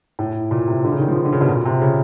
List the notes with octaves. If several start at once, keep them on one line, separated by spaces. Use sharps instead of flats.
A2
A#2
C3
D3
C#3
D#3
F3
D#3
D3
C#3
B2
A#2
C3
C#3